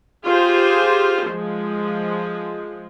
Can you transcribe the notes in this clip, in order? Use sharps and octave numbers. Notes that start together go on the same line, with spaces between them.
F4 G4 G#4 C5
F3 G#3